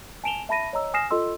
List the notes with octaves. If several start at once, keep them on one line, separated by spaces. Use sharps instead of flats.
G#5 A5 D7 E7 F7 G7
E5 A5 B5 A#6 D#7
C#5 D#5 A#5 E6
G#5 D#6 F6 A#6 C7 E7
F4 A4 D#5 C6 E6